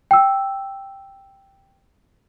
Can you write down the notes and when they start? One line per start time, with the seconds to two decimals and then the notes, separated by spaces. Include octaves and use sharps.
0.11 G5 E6